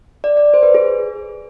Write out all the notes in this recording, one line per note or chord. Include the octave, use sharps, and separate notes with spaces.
D5
D5
C5
B4
G#4